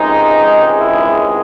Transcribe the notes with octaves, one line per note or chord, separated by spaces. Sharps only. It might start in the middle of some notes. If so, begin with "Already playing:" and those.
Already playing: C#2 C3 D#3 G#3 D#4
E4